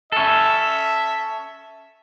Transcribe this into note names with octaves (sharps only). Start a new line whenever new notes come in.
C#4 A4 E5